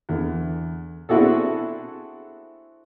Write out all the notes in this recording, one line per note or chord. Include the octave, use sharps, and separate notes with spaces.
E2 D3
C4 D4 E4 F#4 G#4 A4